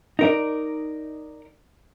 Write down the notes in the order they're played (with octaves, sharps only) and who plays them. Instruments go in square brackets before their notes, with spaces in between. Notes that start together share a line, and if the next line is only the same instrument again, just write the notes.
[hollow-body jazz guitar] D#4 A#4 D5